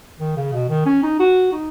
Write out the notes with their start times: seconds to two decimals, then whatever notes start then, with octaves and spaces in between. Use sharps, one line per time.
0.19 D#3
0.36 C#3
0.53 B2
0.69 D#3
0.86 C#4
1.03 D#4
1.20 F#4
1.52 D#4